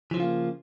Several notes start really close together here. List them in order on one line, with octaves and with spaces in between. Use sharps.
E3 F3 C#3 F4 A#3